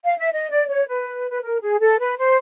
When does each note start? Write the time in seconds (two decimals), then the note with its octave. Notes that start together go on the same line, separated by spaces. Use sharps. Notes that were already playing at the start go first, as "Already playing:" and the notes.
0.03 F5
0.18 E5
0.32 D#5
0.50 D5
0.67 C#5
0.87 B4
1.30 B4
1.42 A#4
1.61 G#4
1.79 A4
1.98 B4
2.17 C5